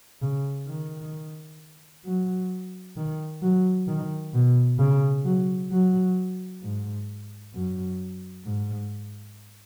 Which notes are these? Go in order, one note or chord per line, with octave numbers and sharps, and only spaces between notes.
C#3
D#3
F#3
D#3
F#3
D#3
B2
C#3
F#3
F#3
G#2
F#2
G#2